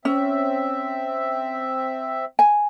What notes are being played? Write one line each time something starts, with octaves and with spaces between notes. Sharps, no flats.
C4 C#4 E5
G#5